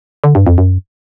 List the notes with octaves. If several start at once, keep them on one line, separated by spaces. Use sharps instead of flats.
D3
G2
F2
F#2